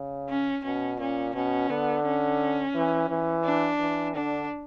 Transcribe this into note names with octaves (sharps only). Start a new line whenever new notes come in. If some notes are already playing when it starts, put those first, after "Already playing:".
Already playing: C#3
C#4
B2 C#4
A#2 C#4
B2 C#4
D3 B3
C#4
E3
E3
D4
E3
D3 D4